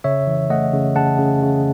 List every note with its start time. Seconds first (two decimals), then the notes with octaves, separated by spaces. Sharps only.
0.04 C#3 C#5 E5
0.27 E3
0.50 A3 D#5 F#5
0.73 C#3
0.96 C#3 F#5 A5
1.18 C#3
1.42 C#3